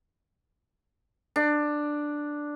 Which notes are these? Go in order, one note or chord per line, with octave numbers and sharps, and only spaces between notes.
D4